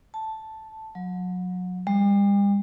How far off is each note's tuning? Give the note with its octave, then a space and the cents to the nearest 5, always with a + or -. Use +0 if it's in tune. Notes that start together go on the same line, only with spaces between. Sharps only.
A5 +0
F#3 -30
G3 +40